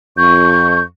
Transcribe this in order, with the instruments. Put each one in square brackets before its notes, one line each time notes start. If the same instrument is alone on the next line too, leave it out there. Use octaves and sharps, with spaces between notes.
[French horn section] F2 [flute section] C#6 [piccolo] G6